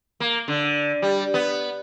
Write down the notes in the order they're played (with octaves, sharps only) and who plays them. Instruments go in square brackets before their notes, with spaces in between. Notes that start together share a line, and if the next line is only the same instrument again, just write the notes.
[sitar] A#3
D3
G3
B3